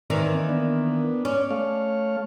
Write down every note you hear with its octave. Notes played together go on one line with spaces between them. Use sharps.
D#3 E3 A#3 C4 D5
B3 D4
C#4 D5
A3 C#5 F5